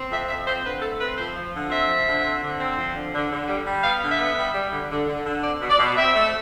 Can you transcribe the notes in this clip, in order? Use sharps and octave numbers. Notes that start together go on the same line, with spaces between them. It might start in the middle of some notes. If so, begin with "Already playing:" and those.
Already playing: C4
F2 E5
F2 E5
C4 C5
D3 B4
A3 A4
C4 B4
F3 C5
F3
D3
C4 E5
F3
D3
C4
D3
C4
F3
D3
D3
D3
G3
G3
B3 F5
D3
E5
B3
G3
G3
D3
D3
D3
D3
C4 D5
B2
D5
B2
C4 E5
A3